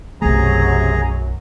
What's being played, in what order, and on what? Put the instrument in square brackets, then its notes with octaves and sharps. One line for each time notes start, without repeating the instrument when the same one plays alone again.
[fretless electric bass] B1 A3 [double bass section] F#2 F#3 [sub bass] C3 [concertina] G#4 A#5